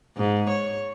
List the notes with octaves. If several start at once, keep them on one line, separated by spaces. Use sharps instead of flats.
G#2
C#5